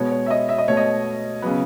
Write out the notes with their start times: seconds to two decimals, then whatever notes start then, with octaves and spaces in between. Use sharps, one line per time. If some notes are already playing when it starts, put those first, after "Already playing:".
Already playing: B2 G#3 B3 C#5
0.11 C#5
0.26 E5
0.30 D#5
0.49 E5
0.58 D#5
0.68 B2 A3 C#5
0.77 D#5
1.42 C#3 F#3 B3